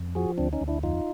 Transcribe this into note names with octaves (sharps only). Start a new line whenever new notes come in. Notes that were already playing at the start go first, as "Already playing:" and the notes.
Already playing: F2
F3 F#4 G#4
D2 C4 D4
C#4 D#4
D2
D4 E4
F2 D#4 F4